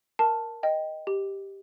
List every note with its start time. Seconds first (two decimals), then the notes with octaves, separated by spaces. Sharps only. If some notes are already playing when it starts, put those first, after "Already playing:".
0.19 A#4 A5
0.63 D#5 G5
1.07 G4